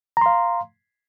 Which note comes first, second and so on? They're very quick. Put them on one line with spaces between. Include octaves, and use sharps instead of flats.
A#5 C6 F5